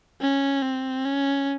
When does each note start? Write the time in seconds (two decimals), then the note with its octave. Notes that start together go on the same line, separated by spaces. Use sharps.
0.21 C#4
0.63 C4
1.05 C#4